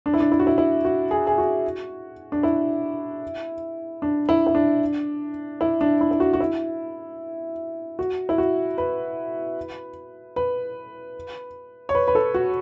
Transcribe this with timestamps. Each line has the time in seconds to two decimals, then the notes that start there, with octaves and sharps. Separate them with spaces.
0.06 D4
0.14 E4
0.20 D4
0.32 E4
0.40 F#4
0.47 E4
0.58 E4
0.85 F#4
1.11 G#4
1.27 G#4
1.38 F#4
2.32 D4
2.43 E4
4.02 D4
4.29 E4
4.47 E4
4.55 D4
5.61 E4
5.81 D4
6.01 E4
6.11 E4
6.20 F#4
6.33 F#4
6.40 E4
7.99 F#4
8.29 E4
8.38 F#4
8.78 B4
10.36 B4
11.89 C#5
11.95 B4
12.08 B4
12.15 A4
12.34 F#4